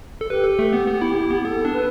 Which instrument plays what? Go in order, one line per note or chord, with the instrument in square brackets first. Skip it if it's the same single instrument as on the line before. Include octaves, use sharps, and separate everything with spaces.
[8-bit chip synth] A4
[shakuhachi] G4 [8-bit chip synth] B4
[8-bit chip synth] A4
A3
B3
B3
E4
E4
B3
[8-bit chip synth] B3 [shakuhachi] A4
[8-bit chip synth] D4
[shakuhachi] B4